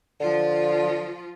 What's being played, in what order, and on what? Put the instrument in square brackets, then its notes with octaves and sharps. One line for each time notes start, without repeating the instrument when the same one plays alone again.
[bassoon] D3 [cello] F3 F4